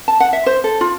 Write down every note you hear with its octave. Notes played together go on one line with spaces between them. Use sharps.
A5
F#5
E5
C5
A4
F4